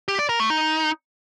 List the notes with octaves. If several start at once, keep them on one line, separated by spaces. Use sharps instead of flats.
G4
D5
A#4
A3
D#4